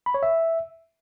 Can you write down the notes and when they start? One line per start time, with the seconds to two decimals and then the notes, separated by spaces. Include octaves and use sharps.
0.06 B5
0.14 C#5
0.23 E5